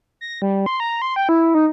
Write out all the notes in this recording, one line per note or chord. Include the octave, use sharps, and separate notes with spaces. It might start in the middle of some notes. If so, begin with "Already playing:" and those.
A#6
G3
C6
A#5
C6
G5
E4
D#4